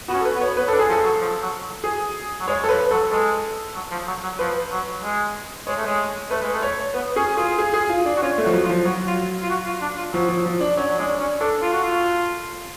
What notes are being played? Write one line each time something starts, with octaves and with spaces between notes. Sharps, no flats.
B3 F#4
C#4
A4
B4
B3
C#5
B3 B4
D4 A4
G#4
F3
A4
F#3
F3
F#3
G#4
F#3
G#3 C#5
A4
F3 B4
F#3 A4
G#3 A4
F#3
F3
F#3
F#3
F3 B4
F#3
G#3
G#3 C#5
A3
G#3
A3 B4
G#3
A3
C#5
B3 B4
C#4 G#4
F4 G#4
G#4
G#4
F4
D4
F#4
C#4 F4
A3
F#4
F3
F#3
F4
F3
F#3 F#4
F4
F4
F#4
F4
D4
F4
F3 F#3
F3
F3
D4
F#3 C#4
F#3
G#3 D4
C#4
D4 A4
F4
F#4
F4